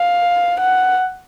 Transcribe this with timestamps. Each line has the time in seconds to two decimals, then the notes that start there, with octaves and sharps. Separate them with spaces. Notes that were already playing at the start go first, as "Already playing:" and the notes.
Already playing: F5
0.60 F#5